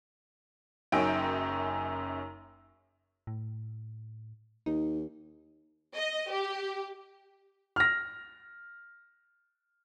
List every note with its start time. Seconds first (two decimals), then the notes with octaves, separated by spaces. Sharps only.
0.92 F#1 F#2 C#4 D#4 G5 D7
3.27 A2
4.66 D#2 D#4
5.96 D#5
6.31 G4
7.76 F6 A#6